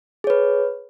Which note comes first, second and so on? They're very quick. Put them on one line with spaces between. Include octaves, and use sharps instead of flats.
G#4 C#5 B4